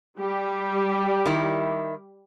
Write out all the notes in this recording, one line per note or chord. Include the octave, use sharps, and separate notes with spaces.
G3 G4
D#3 E4